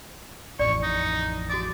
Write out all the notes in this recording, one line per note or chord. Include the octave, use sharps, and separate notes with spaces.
A1 F2 D5 C#6
D#4
F#4 D5 D6 D#6